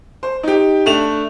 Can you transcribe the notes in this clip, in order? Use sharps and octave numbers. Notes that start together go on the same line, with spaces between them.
C5
D#4 G4
A3 D4 E7 F7